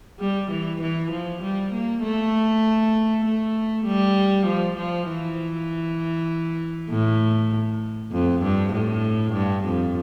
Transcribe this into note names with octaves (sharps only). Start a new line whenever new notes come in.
G3
E3
E3
F3
G3
A#3
A3
A3
G3
F3
F3
E3
A2
F2
G2
A2
G2
F2